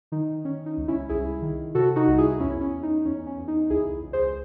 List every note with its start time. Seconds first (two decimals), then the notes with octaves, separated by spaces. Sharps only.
0.12 D#3 D#4
0.45 D#3 C#4
0.66 D#4
0.77 C#2
0.88 C#4 E4
1.09 C2 E4 G#4
1.42 D#3
1.75 C3 F#4 A4
1.96 D#4 F#4
2.07 C2
2.18 E4 G#4
2.40 E2 C#4 E4
2.61 C#4
2.73 E2
2.83 D#4
3.05 E2 C#4
3.27 C#4
3.37 E2
3.48 D#4
3.70 C#2 E4 G#4
4.02 C#2
4.13 G#4 C5